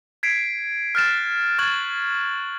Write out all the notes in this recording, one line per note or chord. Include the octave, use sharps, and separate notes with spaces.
G#6 B6 C7 D7
F6 F#6 A6 E7
C#6 F#6 G#6 A6 F#7